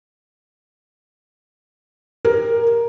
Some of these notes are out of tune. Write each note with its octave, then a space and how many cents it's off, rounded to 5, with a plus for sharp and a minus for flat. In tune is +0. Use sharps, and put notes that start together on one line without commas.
G4 +25 A#4 +5